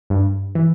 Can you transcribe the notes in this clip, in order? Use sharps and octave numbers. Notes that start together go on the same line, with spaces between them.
G2
E3